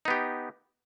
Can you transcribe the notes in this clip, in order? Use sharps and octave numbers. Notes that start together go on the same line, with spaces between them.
B3 D#4 G4